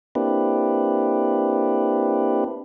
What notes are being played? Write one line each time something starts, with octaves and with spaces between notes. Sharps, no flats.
A#3 C4 D4 E4 G4 B4